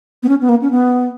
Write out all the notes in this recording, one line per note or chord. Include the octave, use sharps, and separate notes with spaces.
B3
C#4
B3
A#3
C#4
B3